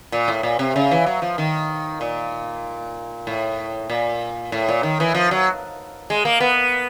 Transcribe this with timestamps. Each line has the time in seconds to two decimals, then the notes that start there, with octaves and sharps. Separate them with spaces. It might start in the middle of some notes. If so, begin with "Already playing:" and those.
0.12 A#2
0.28 A2
0.43 A#2
0.59 C3
0.76 C#3
0.91 E3
1.06 F#3
1.22 F3
1.38 D#3
2.01 A#2
3.27 A2
3.90 A#2
4.52 A2
4.69 A#2
4.83 D#3
5.00 E3
5.15 F3
5.31 F#3
6.10 G#3
6.25 A#3
6.40 B3